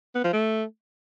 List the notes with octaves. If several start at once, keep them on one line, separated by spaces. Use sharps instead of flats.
B3
F3
A3